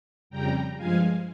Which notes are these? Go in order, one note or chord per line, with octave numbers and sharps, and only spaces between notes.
F2 C#3 G3 G5 A#5
G2 F3 G#3 F5 G#5